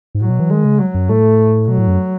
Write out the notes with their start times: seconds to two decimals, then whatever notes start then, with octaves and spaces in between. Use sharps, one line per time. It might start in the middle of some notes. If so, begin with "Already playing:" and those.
0.15 G#2
0.21 A2 F#3
0.29 B2
0.40 E3
0.50 D#3 G#3
0.65 C#3
0.79 F#3
0.94 F#2
1.09 A2 A3
1.68 B2 F#3
1.78 A2
1.88 F#2